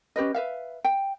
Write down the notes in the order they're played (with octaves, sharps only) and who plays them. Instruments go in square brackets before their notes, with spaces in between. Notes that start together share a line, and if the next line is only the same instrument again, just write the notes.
[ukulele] C#4 G4 B4 D#5
B4 E5 F5
G5